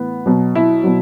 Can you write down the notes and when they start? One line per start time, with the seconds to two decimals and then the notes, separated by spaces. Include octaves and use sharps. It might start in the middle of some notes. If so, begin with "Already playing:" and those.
Already playing: A2 E3 B3
0.26 B2 F#3
0.55 E4
0.84 B2 F#3